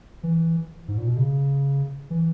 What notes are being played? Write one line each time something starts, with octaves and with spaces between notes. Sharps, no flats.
E3
G#2
A#2
B2
C#3
E3